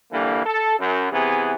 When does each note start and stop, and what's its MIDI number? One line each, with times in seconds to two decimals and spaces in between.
0.12 0.44 50
0.12 0.44 52
0.12 0.44 55
0.12 0.44 58
0.45 0.74 69
0.79 1.07 42
1.12 1.54 48
1.12 1.54 52
1.12 1.54 59
1.12 1.54 68